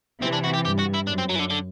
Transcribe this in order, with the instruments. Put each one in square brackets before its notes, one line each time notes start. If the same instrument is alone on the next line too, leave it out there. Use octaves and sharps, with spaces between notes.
[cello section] C3 E3 [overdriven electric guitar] C4
[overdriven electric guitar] D4
F#4
G4
[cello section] G2 [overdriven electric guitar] G4
[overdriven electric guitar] F#4
E4
[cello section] F#2 [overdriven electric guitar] D4
[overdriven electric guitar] C4
F#3
E3
D3
D3